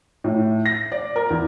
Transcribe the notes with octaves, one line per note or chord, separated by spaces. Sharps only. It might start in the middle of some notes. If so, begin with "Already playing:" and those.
A2
A#6
D5
A#4
E2